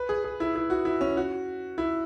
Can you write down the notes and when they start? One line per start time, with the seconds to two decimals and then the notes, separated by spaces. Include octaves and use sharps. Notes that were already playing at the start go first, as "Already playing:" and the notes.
Already playing: B4
0.09 G#4
0.24 G#4
0.40 E4
0.55 E4
0.70 F#4
0.85 E4
1.01 C#4
1.17 F#4
1.78 E4